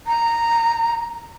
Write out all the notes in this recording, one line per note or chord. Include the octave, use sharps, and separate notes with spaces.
A#5